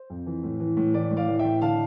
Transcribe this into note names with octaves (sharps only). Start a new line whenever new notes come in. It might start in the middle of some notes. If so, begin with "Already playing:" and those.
Already playing: C5
F2
E3
A2
E3
A2
E3 D5
A2
D5 F5
E3
E5 G5
A2
D3 F5 A5